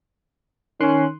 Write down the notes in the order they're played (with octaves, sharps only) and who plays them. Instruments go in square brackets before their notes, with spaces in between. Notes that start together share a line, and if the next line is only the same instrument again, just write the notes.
[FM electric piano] D#3 C6 F#6 [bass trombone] C#4